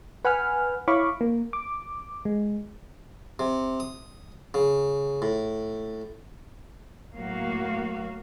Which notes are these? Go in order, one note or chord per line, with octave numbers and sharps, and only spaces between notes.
B4 F#5 G#5 B5 F6
E4 C#5 F5 B5 C#6 D6
A#3
D6
G#3
C3
D#6
C#3
A2
A2 F#3 A#3 F#4 F5